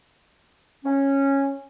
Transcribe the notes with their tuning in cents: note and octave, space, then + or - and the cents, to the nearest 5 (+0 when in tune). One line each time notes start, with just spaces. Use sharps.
C#4 -10